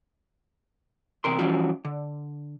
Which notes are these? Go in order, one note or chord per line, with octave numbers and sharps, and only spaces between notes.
E2 C3 A#4 C6
E3 F3 G3 C#4 F4 F#4
D3